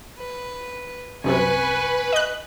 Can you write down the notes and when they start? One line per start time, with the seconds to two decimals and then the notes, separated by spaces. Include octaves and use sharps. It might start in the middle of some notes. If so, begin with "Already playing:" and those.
0.18 B4
1.24 C2 F#2 C3 B4 G#5 C#6
2.13 D#5 F#6